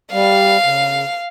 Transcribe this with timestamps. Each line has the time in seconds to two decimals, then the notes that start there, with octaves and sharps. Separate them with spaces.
0.12 G3 F5
0.64 C#3